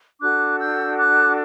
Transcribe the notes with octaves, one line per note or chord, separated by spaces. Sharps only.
D4 F#4 A4 D6 F#6
E6 G6
D6 F#6